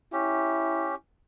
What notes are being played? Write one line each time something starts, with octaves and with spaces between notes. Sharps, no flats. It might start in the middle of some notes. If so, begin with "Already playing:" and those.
C#4 E4 G4